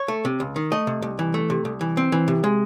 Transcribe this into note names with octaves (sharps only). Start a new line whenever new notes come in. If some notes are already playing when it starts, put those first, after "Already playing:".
Already playing: C#5
A3
C3
C#2
D#3
A3 D#5
C3
C2
E3
A3
C3
C2
E3
C4
E3
C3
G#3